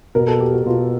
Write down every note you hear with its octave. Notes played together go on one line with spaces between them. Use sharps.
B2 A#4
A4
G4
F#4
B2 F4